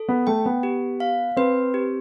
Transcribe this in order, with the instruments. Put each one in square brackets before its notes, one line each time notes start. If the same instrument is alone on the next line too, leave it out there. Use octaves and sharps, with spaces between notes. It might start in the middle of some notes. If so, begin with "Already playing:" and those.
Already playing: [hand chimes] A4
[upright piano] B3
[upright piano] A3 [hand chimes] G5
[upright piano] B3
[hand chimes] G4
F5
[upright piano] C4 [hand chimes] B4
[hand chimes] G4